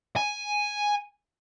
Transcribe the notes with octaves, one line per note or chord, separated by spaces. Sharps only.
G#5